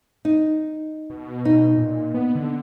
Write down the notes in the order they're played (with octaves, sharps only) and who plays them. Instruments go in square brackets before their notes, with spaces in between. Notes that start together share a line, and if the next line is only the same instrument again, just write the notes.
[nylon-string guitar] D#4
[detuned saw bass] B2
[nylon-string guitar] D#4
[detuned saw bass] A#2
B3
D3